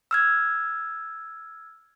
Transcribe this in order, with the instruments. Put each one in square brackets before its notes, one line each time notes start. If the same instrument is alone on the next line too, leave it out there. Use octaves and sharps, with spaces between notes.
[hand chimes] E6 F6 G#6